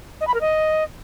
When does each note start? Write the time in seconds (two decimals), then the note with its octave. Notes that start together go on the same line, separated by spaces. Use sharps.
0.21 D#5
0.27 B5
0.34 A#4
0.41 D#5